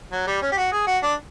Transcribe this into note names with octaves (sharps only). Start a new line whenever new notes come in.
F#3
G3
C#4
G4
F#4
G#4
F#4
D4